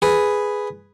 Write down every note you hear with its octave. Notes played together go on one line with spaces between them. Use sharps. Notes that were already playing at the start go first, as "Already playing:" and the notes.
G#4 B4